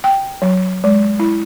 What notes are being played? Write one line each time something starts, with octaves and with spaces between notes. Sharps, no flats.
G5
F#3
G#3
E4